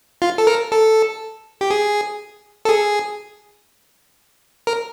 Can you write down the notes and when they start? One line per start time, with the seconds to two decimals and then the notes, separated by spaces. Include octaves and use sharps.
0.22 F4
0.38 A4
0.47 A#4
0.72 A4
1.61 G4
1.70 G#4
2.65 A4
2.69 G#4
4.67 A#4